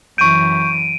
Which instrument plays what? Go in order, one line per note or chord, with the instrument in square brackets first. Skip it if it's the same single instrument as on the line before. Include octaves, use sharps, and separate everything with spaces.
[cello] F#2 E3 [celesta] C#6 G6 [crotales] D7 D#7